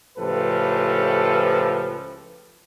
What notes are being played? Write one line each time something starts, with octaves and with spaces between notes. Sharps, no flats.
C#2 A2 F3 G4 A4 B4